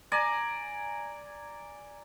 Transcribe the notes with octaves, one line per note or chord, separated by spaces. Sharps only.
D5 G#5 A#5